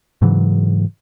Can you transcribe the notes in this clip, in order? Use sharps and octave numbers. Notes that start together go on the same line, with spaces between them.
G#2 C#3 E3 F#3